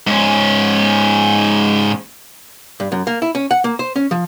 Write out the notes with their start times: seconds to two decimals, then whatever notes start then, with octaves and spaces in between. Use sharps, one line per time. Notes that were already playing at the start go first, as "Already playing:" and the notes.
0.07 G#2 C#4
2.80 G2
2.92 F#2
3.07 A#3
3.22 E4
3.35 C#4
3.51 F#5
3.64 A#3
3.79 C5
3.96 C#4
4.11 F3